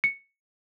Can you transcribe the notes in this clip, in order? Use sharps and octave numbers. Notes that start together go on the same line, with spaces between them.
C#7